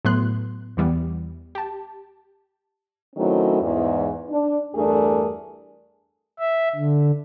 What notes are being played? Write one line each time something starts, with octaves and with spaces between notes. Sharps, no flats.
A2 F#3 B3 C6 F#6
E2 E3 G3 B3
G4 A5
D#3 F#3 A3 C4 C#4 E4
E2 G#2
D4
E2 G2 A3 D4 G#4 A#4
E5
D3